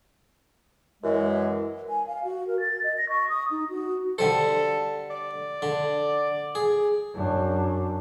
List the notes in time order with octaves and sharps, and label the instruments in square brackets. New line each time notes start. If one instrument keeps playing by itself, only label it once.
[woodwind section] F#2 E3 G#3
[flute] G#5
F5
F#4
A#4
A6
D#5
A#6
C#6
D#6
D#4
F#4
[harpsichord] D3 G3 C5 [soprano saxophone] A4
[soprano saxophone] D5
[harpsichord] D3
G#4
[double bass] F#2 D4